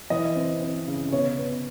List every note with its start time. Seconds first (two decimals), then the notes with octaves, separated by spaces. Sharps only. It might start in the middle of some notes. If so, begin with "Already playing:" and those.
0.10 E3 D#5
0.36 C4
0.61 C4
0.87 C#3
1.12 B3 C#5
1.38 B3